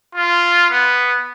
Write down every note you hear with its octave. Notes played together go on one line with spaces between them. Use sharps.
F4
B3